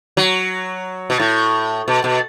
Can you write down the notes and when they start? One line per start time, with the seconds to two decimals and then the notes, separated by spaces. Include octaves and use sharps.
0.17 F#3
1.10 B2
1.20 A2
1.88 B2
2.04 B2